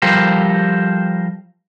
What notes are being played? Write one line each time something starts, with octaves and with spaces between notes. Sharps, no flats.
F3 G3 G4 A4 A#4 C5